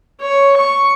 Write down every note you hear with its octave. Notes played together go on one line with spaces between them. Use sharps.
C#5
C#6